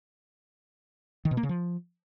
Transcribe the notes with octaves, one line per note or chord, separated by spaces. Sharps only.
D#3
B2
A#3
C#3
F3